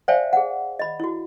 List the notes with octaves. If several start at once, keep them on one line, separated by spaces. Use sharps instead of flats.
C5 D5 E5 F5 G5 G#5
G#4 F#5
D#5 B5
E4 F#4